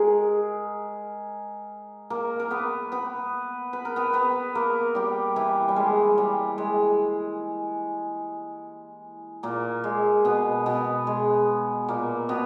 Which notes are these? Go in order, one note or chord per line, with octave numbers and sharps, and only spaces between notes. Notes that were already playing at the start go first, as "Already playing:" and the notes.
Already playing: G#3 G#4 A#4
A#3 A#4
A#4
B3 B4
B3 B4
B4
A#4
B3 B4
B3 B4
A#3 A#4
G3 G4
E3 E4
G3
G#3
G3
G#3
A#2 A#3
G#3
B2 B3
B2 B3
G#3
A#2 A#3
B2 B3